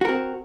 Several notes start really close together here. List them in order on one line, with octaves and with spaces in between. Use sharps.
F#4 A#4 C4